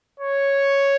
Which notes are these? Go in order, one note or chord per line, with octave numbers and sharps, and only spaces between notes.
C#5